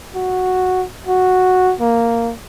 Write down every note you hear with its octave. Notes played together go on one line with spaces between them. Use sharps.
F#4
F#4
A#3